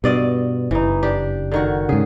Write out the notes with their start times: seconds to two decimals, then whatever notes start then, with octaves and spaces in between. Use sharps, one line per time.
0.04 G2 B2 D5 D#5
0.71 F#1 E3 D#4
1.03 D4 G4
1.52 D3 D#3 F#4
1.89 G#2 C#3 G#4